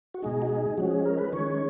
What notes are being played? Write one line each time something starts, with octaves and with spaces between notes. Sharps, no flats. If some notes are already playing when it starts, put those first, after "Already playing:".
F#4
B2 G#3 D#4 G#4
F#4
G#4
F3 G#3 C#4 F#4
G#4
A#4
B4
D#3 G#3 C#4 C#5